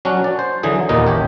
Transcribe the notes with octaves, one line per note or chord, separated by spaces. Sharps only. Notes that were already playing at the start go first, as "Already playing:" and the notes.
F#3 C#4 D4 F#4
D5
C5
D3 E3 F#3 G#4
D#2 A#2 B3 D#4 D#5
A1 G4 C#5